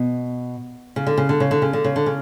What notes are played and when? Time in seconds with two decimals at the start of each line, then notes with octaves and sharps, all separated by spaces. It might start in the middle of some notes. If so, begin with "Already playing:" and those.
Already playing: B2
0.96 C#3
1.07 D3
1.18 C#3
1.29 D3
1.40 C#3
1.51 D3
1.62 C#3
1.73 D3
1.84 C#3
1.96 D3
2.06 C#3